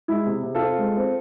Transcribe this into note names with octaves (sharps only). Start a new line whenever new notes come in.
G#3 E4
C3
C3
F4 A4
C4
G#3
C4